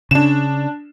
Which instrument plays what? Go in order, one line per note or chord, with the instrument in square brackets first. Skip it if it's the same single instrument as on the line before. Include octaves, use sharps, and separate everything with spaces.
[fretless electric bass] C#3 [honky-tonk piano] D4 E7